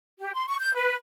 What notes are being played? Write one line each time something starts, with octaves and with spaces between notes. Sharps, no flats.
G4
C6
C#6
G6
B4